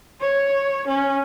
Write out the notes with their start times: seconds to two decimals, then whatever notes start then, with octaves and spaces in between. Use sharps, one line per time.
0.21 C#5
0.88 C#4